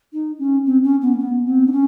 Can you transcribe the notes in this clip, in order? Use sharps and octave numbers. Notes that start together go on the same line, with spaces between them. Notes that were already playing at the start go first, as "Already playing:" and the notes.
D#4
C#4
C4
C#4
B3
A#3
B3
C4
D4
C#4